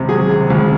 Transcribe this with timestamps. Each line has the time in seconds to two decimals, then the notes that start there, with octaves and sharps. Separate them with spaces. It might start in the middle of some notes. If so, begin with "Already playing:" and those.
Already playing: C#2 C3
0.09 F#3 G#4
0.29 C3
0.50 C#2